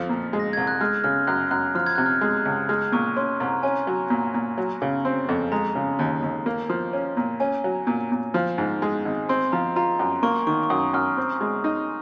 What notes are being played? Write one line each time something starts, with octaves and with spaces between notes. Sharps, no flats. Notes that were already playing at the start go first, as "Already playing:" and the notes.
Already playing: F2 F3
A#2
G#3
A#6
C2 G#6
F#6
G#3 F6
C#3 F6
F#2 F#6
F#2 F#6
F3 F6
G#6
C3 F#6
F6
G#3
F#6
C#2
G#3 F6
A#2 C#6
C#4 C6
C2 A#5
C#4 G#5
F#3
A#2
A#2
F#3
C#3
C4
F2
G#3 A#5
C#3
D#2
D#2
A#3
F3
C#4
A#2
C#4 G#5
F#3
A#2
A#2
F3
G#2
G#3
G#1
C4 C6
F3 A#5
F4 A#5
F#2
A#3 C#6
D#3 C#6
C#6
F#2 D#6
F#2 F6
C4
G#3
D#4